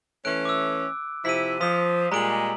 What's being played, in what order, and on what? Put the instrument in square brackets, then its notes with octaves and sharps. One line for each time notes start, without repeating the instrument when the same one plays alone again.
[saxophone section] E3 A3 C#4 [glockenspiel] F#6 D7
[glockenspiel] D6 E6
[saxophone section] C3 F3 E4 [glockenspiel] B6 D#7
[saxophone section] F3 [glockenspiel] D#6 B6
[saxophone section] A#2 G3 G#3 [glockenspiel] A#5 D7 F#7